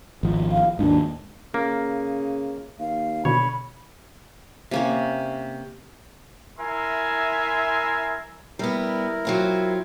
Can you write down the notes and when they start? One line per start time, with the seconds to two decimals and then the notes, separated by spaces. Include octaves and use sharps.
0.23 G#1 F3
0.52 F5
0.79 D#2 G#2 D4
1.54 C#3 A#3
2.79 D#2 F5
3.25 B2 D3 C#5 B5
4.71 C3 A#3 C#4
6.59 E4 A#4 E5 G#5 C6
8.59 G3 B3 E4 A#4
9.25 F#3 C4 F4